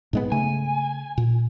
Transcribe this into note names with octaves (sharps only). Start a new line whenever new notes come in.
G#2 G#3 B3
C#3 A3 G#5
A#2